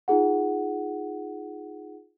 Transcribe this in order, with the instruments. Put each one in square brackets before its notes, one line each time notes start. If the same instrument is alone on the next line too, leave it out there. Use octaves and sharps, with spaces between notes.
[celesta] D#4 F4 G#4 F#5